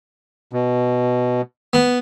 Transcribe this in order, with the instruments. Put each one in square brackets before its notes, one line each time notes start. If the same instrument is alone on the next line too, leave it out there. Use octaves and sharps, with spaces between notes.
[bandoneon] B2
[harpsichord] B3